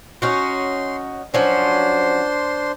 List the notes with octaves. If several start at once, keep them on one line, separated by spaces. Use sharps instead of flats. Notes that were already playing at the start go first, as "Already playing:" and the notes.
C#4 D#4 F#4 C6
F3 F#3 C#4 D4 C5 C6